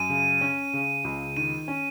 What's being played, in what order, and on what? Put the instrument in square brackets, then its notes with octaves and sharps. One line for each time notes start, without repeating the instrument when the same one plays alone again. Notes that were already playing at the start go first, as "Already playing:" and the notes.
Already playing: [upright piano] F#2 [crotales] D#7
[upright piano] C#3
C#4
C#3
C#2
[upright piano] D#3 [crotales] D#7
[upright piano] C#4